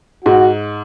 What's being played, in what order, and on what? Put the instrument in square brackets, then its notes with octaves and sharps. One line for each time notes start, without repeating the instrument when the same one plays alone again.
[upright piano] G#2 [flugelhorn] F#4